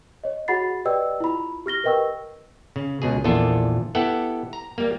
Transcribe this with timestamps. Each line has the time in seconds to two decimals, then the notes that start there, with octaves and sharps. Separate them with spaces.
0.24 C#5 D#5
0.48 F#4 G#4 F#5 B5 A6 C7
0.85 G4 B4 D5 D#5 G5 E6
1.20 E4 F4 B5
1.66 G4 F6 A#6 G7
1.84 A#4 B4 D#5 G5 C#6 E6
2.76 C#3
3.02 C#2 B2 G#4
3.24 A#1 E2 A#2 D4 F4 A4
3.95 B3 E4 G4 A4 F#5 G5
4.53 A#5
4.78 G3 A#3